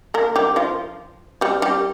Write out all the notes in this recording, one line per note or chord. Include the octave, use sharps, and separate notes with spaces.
A#3 A#4
G3 G4
F3 F4
G3 G4
G3 G4